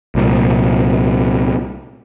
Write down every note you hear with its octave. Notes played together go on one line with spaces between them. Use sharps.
C2 A#2